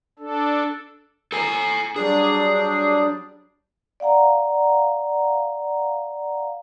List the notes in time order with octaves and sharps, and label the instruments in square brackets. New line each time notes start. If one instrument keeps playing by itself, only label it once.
[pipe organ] D4 A4
[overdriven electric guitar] A4 G#5
[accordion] F#3 G3 D4 [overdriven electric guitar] G#4
[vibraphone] D5 F5 F#5 A#5